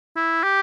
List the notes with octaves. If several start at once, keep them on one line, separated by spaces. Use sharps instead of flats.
E4
G4